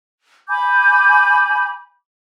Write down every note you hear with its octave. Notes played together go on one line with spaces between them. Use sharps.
G#5 B5 D6 G6